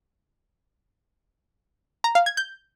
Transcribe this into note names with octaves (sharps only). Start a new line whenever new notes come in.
A#5
F5
G#6
G6